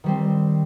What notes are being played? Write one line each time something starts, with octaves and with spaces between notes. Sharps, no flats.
D#3 G3 C4